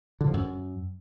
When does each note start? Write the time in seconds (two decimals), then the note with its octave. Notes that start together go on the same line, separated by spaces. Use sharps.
0.21 D3
0.27 F3
0.34 F#2